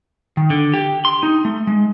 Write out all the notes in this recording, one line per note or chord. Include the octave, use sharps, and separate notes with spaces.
D#3
D3
G4
C6
D#4
A3
G#3